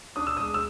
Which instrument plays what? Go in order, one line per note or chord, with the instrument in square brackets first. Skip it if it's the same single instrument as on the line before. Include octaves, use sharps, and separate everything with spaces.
[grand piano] D4 D#6
E6
G#3 D#6
E6